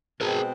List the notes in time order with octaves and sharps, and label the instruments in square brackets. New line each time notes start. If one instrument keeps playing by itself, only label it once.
[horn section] B2 G#3 C4 [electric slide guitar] G#4 A#4